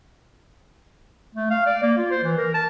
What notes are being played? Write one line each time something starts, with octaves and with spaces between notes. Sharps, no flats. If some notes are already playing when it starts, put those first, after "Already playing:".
A3
F5
D5
A#3
F4
C5
E3
A#4
A5